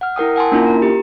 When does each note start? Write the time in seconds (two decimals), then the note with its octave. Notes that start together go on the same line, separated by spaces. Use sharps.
0.01 F#5 F6
0.16 E4 A#4 G5 D#6
0.36 F#5 G#5 A5 C6
0.52 A#3 C#4 D4 E4 F4 A#4
0.66 A#5
0.82 G4